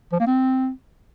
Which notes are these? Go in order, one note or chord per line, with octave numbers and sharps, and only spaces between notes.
F3
A#3
C4